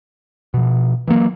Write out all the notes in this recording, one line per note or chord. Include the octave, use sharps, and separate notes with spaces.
B2 F3
E3 F#3 A#3